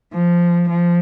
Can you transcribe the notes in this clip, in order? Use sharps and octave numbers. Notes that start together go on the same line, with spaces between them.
F3
F3